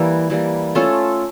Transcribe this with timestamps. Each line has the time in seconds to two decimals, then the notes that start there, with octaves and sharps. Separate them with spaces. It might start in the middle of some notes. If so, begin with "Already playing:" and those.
Already playing: E3 G3 A#3
0.30 E3 G3 A#3
0.75 A3 C#4 F4 A4